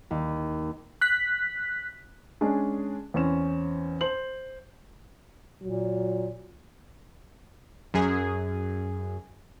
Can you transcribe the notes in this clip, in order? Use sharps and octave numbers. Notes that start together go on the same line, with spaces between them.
D#2
F#6 B6
G#3 C#4 D4 G#4
E2 C4 C#4 E7
C5 F#7
A#2 F#3
F#2 G#4